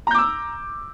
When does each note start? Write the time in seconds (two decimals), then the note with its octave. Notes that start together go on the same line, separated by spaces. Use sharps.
0.07 A#5
0.11 G6
0.15 D6
0.18 E6